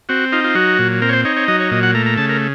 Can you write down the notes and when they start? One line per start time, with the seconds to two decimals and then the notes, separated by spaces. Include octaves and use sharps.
0.09 C4 F#4
0.32 D#4 F4
0.44 F4
0.55 F#3 F#4
0.79 A#2
1.02 C4 A#4
1.09 C#5
1.13 C5
1.25 D#4 C#5
1.36 C#5
1.48 F#3 D#5
1.60 C#5
1.71 A#2 D#5
1.83 F#5
1.95 A3 A#5
2.06 A#5
2.18 C#3 A5
2.29 A#4